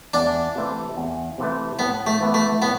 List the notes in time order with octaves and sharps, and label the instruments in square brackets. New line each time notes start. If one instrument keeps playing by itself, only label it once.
[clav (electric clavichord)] E2 [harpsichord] D4
[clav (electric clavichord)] C3 E3 A3
E2
C3 E3 A3
[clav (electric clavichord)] A2 [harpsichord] B3
[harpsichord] A3
[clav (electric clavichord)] E3 B3
[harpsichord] A3
[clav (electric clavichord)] A2 [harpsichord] B3